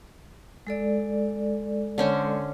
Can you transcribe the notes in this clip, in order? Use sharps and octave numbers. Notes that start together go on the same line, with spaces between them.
G#3 A4 D5
D3 C#4 C5